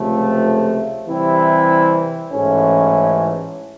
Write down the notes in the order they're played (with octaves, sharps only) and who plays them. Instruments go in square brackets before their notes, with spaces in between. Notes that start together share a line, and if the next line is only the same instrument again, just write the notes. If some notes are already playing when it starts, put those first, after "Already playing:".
Already playing: [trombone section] C#2 C3 F3 A3
C3 E3 G3 C4 E4
A1 G#2 E3 A3 C#4